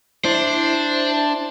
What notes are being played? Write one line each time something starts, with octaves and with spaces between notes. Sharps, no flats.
D4 E4 C5